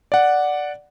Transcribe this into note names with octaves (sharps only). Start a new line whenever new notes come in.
D5 F#5